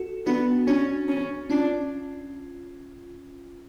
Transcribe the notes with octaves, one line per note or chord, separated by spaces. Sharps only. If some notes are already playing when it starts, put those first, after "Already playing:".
Already playing: F#4 A4
B3 D4 F#4
C#4 D4 F#4
C#4
C#4 D4 F4